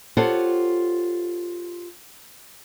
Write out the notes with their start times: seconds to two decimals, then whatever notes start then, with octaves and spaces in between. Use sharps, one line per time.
0.17 F4 G4 A4 C5 C#5 F#5